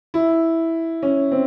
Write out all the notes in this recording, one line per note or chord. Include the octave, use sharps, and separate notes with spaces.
E4
C#4
C4